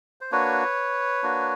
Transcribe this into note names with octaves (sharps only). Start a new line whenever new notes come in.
C5
A#3 D4 F#4 B4 C#5
A#3 D4 F#4